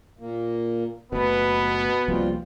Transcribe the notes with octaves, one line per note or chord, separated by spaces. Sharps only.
A#2 A#3
F#1 B2 A3 B3 B4
C2 F3 G3 A#3 C4 F4